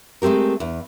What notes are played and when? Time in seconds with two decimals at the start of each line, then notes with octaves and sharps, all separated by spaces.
0.22 G#3 A3 C4 G4 A#4
0.60 E2